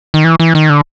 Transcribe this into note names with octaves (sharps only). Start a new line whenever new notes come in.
D#3
E3
E3
D#3
D3